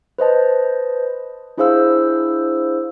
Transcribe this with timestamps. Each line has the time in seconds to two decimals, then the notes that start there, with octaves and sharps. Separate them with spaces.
0.19 B4 C5 D#5 A5
1.58 D4 E4 G#4 C5 F5 E6